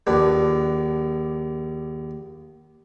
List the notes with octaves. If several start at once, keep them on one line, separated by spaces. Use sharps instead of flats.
A#1 D#2 D4 B4